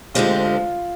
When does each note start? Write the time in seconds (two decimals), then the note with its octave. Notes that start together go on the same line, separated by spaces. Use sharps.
0.14 D2 D3 G#3 C4 F4 G4
0.44 F4